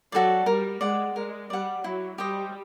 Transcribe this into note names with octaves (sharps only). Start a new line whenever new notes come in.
F#3 F#4 A4 D5
G3 A#4
G#3 D5 F#5
G#3 A#4
G3 D5 F#5
F#3 E4
G3 G4 C5 D#5